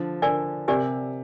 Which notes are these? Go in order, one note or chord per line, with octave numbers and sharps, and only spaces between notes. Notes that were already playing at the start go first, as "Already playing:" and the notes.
Already playing: D3 F3
D3 A#4 D5 G#5
C3 G4 A#4 D5 G#5